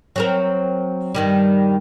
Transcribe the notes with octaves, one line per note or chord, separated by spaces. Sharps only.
F#3 C4 A#4
G2 D#3 G3